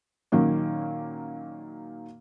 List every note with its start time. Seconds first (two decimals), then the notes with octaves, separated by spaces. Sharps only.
0.32 A#2 D#3 F#3 A#3 C#4